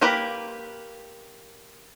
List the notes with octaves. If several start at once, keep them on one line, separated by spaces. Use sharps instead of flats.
A#3 G4 A#4 B4